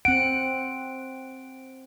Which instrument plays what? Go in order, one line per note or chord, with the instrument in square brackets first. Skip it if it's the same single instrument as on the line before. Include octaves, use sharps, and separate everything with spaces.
[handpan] C4 F#5 [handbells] D7